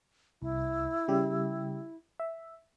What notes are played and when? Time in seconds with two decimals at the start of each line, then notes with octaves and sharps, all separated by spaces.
0.42 C2 E4
1.08 C#3 G3 G4
2.20 E5